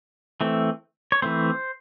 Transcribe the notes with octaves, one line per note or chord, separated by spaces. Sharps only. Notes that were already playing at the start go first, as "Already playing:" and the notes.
E3 A3 C4
C#5
E3 A3 C4 C5